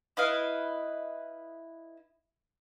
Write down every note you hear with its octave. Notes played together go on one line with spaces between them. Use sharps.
E4 B4 D#5 F5